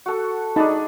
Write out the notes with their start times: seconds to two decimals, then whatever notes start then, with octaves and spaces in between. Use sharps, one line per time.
0.06 F#4 A4
0.56 D4 D#4 G#4 A5 B5